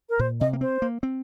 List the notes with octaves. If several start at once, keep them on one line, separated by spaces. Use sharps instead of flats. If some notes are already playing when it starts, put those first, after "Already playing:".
A#4
A#2 C5
C3 D#5
A#3
C4 C5
A#3
C4